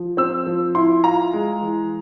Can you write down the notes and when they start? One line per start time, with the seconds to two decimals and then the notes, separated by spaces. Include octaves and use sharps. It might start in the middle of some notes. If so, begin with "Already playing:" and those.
Already playing: F3
0.17 C4 E6
0.46 F3
0.75 E4 C6
1.04 F4 A#5
1.33 G#3
1.62 E3